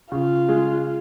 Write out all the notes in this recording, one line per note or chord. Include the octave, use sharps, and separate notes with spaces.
C#3 F4
G#3